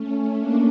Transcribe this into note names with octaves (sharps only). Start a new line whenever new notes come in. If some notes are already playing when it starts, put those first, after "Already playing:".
Already playing: A3 C#4
A#3 D4